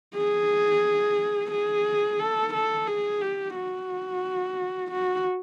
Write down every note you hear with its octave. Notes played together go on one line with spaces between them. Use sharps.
G#4
G#4
A4
A4
G#4
G4
F#4
F#4